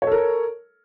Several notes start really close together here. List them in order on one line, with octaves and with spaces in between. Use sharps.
C#5 A4 A#4